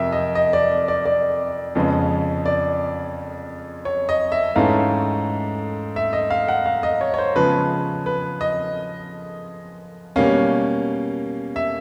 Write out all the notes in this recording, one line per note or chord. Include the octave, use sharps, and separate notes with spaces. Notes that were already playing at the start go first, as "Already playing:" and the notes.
Already playing: F2 C3 F3 A#4 E5
D#5
D#5
D5
D5
D5
F2 C#3 F3 G#3 B3
D5
C#5
D#5
E5
G#2 E3 A3 C#4 F5
E5
D#5
F5
F#5
F5
D#5
C#5
C#5
C5
C#3 F3 G#3 B3 B4
B4
D#5
B2 G3 A#3 C#4 F5
E5